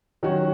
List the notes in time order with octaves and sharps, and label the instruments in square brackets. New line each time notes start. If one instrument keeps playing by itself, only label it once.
[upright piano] D#3 F#3 C#4 F#4 C#5